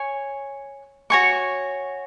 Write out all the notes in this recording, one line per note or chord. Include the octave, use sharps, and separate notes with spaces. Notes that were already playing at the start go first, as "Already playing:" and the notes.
Already playing: C#5 G#5
F#4 C#5 G#5 C#6